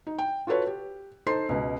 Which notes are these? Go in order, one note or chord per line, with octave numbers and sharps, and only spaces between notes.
D#4
G5
F4 F#4 A4 B4 C#5
G4
D#4 A4 C5 C6 C7
C#2 B2